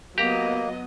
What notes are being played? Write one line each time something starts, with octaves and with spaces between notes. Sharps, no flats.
F#3 A#3 B3 G4 D#5 A#5